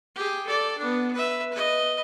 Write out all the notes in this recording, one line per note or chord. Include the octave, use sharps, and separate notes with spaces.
G4 G#4
A4 D5
B3 D4
B4 E5
B4 D#5